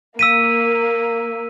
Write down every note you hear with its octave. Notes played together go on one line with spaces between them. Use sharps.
A#3 E6 B6 D#7